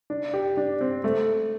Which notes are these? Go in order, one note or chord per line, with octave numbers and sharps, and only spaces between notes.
D4
G4
D4
C4
A3